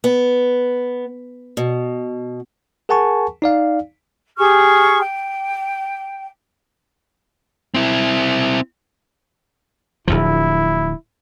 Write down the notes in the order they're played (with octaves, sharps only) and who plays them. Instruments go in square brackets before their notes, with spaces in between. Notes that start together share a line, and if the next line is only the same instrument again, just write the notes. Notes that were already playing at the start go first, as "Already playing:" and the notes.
[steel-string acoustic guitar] B3
B2
[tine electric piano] G#4 A#4 F#5 G#5 A5 C#6
D#4 D5 F5
[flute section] G4 G#4 C#6 F6
G5
[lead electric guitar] C4 E4
[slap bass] D1 D2 F3 [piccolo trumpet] E4